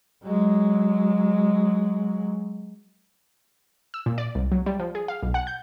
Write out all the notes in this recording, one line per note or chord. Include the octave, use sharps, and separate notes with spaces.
F#3 G#3
E6
A#2
D5
C2
F#3
G3
F3
G#4
F5
B1
F#5
G6